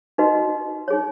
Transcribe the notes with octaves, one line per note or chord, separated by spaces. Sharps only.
D#4 F#4 B4 D#5
D#4 G#4 C#5